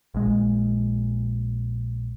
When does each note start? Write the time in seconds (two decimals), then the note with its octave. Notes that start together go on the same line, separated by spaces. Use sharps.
0.14 A#1 G#3